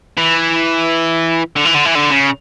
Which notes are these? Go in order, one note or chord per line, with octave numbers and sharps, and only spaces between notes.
E3
D3
E3
D3
E3
D3
C#3